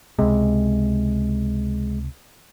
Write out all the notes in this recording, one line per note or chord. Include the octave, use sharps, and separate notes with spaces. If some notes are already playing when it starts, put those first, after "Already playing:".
C#2 C3 G#3